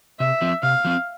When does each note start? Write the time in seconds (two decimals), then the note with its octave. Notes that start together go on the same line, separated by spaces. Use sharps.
0.20 C3 E5
0.42 F3 C4
0.63 C3 F5
0.85 F3 C4